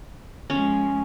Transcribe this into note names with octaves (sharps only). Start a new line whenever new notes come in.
F3 G#3 C#4